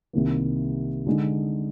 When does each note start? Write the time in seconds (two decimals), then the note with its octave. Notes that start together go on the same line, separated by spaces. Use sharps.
0.13 C2 C3 D#3 A#3
1.06 D3 G#3 D#4